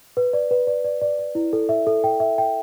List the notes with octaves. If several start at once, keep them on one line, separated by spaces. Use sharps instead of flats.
B4
D5
B4
D5
D5
D5
D5
E4
A4
E5
A4
G5
E5
G5